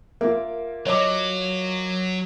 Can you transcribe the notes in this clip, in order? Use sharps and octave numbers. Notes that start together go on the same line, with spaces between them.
A#3 F4 A#4 E5
F#3 C#5 D#5 D6